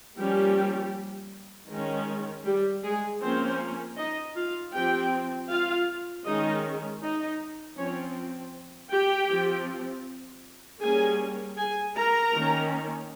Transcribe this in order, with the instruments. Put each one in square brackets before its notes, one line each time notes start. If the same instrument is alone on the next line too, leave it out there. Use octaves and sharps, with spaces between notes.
[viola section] F3 G3 A#3 C#4 G4
D#3 G#3 C#4
G3 G4
G#3 G#4
F3 A#3 C4 C#4 C5
D#4 D#5
F4 F5
F3 C4 G4 G5
F4 F5
D#3 G#3 C#4 D#4 D#5
D#4 D#5
F3 C4 C#4 C#5
G4 G5
F3 C4
G3 A#3 C#4 G#4 G#5
G#4 G#5
A#4 A#5
D#3 A#3 C#4